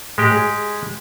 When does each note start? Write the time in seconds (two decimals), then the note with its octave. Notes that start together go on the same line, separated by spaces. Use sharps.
0.18 A2 G#3 G4
0.31 G#4